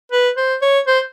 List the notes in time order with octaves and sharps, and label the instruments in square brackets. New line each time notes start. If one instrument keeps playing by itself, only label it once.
[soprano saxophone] B4
C5
C#5
C5